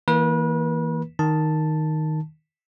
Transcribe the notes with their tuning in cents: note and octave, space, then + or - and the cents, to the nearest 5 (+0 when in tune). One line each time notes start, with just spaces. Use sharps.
E3 -30 A#3 +0 B4 -35
D#3 +0 A5 +0